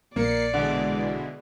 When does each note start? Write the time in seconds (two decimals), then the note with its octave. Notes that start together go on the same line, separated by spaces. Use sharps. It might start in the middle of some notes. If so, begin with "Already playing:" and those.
0.16 A#1 A#3 D5 C7 C#7
0.53 B2 D3 E3 G#3